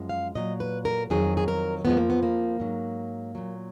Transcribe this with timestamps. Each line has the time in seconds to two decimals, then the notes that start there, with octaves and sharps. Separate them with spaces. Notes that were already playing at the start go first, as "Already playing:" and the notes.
Already playing: F#2 F3 G#3
0.09 F5
0.35 A#2 F#3 D#5
0.60 B4
0.85 A#4
1.10 F2 D#3 F#3 G#4
1.37 G#4
1.48 A#4
1.85 F2 F3 G#3 B3
1.97 A#3
2.10 B3
2.23 A#3
2.60 G#2 F#3
3.35 A#2 F#3